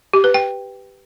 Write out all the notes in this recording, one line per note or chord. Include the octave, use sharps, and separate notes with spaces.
G4
B4
G5